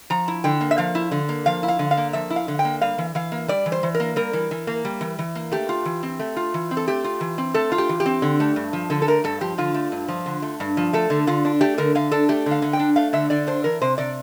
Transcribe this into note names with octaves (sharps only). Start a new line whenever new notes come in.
F3 A#5
E4
D3 G5
A#3
E5
F3 F5
E4
D3
A#3
F3 F5
E4
F5
D3
F5
A#3
F3 E5
E4
F5
D3
G5
A#3
G3 F5
E3
E3 F5
A#3
G3 D5
E3
C5
E3
A#4
A#3
G3 A#4
E3
E3
A#3
G3
E3
E3
A#3
A3 G4
F4
E3
C4
A3
F4
E3
C4
A4
A3 G4
F4
E3
C4
A3 A4
F4
G4
E3
G4
C4
D3
A3
G2
F3
D3 A4
A4
A3 A#4
G2 A4
F3 G4
D3 F4
A3
G2
F3
D3
A3
G2
F3
A3 A4
D3
D3 F4
D4
A3 G4
D3 A#4
D3 F5
D4 A4
A3 G4
D3
F5
D3
G5
D4
A3 F5
D3 E5
D3 D5
D4 C5
E3 A#4
C3 C5
C3 D5